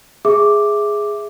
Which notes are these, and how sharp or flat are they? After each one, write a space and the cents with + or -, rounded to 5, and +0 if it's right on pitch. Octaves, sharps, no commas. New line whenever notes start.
G#4 +0 E5 +0 D6 +0